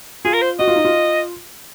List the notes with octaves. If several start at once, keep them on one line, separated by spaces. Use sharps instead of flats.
F4 G#4
A#4
C5
F#4 D#5
F4
D#4
F4